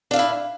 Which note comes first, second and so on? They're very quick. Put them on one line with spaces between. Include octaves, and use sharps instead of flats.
D4 F5 E5 E4